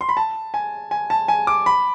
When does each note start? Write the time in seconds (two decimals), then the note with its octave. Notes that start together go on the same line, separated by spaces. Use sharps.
0.01 C6
0.09 B5
0.17 A5
0.54 G#5
0.91 G#5
1.10 A5
1.28 G#5
1.47 D6
1.66 B5